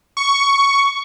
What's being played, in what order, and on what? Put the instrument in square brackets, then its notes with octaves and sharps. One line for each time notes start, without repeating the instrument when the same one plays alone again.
[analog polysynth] C#6